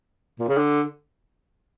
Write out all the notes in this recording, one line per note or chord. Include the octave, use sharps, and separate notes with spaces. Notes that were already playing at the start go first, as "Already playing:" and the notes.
A#2
C#3
D3